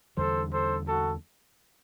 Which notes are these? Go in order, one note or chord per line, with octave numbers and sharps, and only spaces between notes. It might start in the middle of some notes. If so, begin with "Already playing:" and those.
E2 D3 G3 A4 C5
A4 C5
F#4 A4